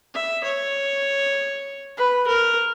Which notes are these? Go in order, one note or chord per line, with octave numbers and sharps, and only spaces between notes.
E5
C#5
B4
A#4